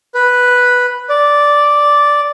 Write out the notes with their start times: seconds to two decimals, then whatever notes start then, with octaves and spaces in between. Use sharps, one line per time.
0.15 B4
1.09 D5